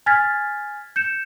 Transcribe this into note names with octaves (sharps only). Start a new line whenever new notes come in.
G#5 F6 G#6 A6 B6
G6 C#7 E7